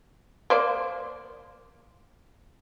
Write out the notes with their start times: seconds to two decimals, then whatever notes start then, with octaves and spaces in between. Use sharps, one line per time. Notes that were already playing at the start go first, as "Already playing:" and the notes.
0.50 A#3 C5 D5